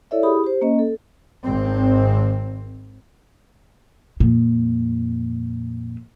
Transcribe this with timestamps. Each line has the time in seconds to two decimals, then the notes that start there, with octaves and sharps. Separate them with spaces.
0.11 E4 A4 C#5 D5 E5
0.23 E4 G4 G#4 B5 D#6
0.44 G4 C5
0.61 A#3 C#4 D#5
0.79 A4
1.43 G#1 C4
4.20 F2 A#2